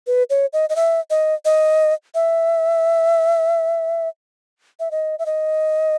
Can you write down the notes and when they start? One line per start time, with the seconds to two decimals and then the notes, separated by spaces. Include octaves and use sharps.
0.07 B4
0.30 C#5
0.53 D#5
0.70 D#5
0.76 E5
1.10 D#5
1.45 D#5
2.15 E5
4.80 E5
4.91 D#5
5.19 E5
5.26 D#5